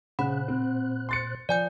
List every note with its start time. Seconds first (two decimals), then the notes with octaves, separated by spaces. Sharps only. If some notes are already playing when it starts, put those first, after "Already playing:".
0.19 A#2 C#3 C5 F#5 B5 F#6
0.48 C4
1.09 C6 A6 C#7
1.49 F3 D5 G#5 G6